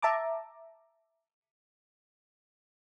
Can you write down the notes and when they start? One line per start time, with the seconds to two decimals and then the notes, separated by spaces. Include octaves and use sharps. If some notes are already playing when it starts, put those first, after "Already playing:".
0.02 E5 A5 A#5 D6